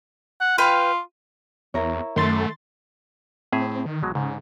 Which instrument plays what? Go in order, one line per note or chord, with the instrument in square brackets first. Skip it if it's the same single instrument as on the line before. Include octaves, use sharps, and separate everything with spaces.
[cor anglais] F#5
[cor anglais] F4 [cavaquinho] B4 F5 G5
[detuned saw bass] E2 [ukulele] E4 A#4 C#5
[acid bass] F#2 [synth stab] D#3 C6 A6 [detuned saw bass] A3
[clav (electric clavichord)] A2 G#4 E5 [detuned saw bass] C4
[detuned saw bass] D#3
[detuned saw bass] G#1 [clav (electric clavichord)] B2 F#3 G#3
[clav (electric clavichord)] G#2 [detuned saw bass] C#3